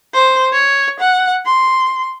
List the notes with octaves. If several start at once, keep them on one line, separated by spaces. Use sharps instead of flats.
C5
C#5
F#5
C6